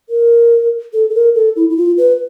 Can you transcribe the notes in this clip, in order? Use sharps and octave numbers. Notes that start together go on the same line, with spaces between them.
A#4
A4
A4
A#4
A4
E4
E4
F4
B4